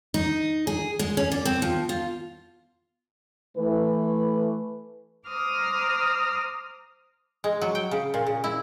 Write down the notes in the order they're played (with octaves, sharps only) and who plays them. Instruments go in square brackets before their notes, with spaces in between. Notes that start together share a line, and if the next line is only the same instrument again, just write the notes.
[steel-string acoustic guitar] D#4
G#4
G#3
C#4
D5
C4
F3
F4
[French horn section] E3 A3 B4
[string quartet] C5 A#5 D6 D#6 F6
[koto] G#3
F#3
G5
C#3
A#2
C#3
E4